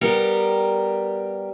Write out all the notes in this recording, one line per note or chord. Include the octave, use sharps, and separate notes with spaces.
G3 B3 G4 A#4